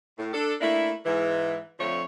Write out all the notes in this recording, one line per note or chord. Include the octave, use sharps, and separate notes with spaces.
A2
D4 A4
A3 A#3 D4 E4
G#2 E3
F2 D3 F3 A3 C#5